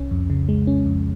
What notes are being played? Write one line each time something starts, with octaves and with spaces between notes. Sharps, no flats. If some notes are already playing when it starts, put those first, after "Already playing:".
Already playing: C2 C#4
F2
C#3
G#3
C#4
F2